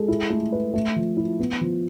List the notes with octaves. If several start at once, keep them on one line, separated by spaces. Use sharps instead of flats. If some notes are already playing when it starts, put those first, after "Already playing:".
Already playing: G#3 A4
E4
A3
B4
A3
F3
E4
B3
F3